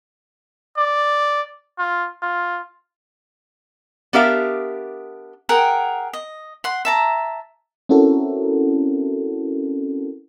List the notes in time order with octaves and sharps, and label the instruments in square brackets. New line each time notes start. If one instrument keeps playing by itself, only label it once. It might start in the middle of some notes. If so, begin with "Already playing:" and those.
[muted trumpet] D5
F4
F4
[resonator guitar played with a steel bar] B3 D4 G4 A#4 E5 F5
[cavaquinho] G#4 A#4 F#5 G5
D#5
F#5 C6
E5 A5 A#5
[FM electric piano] C4 C#4 E4 F#4 A4 A#4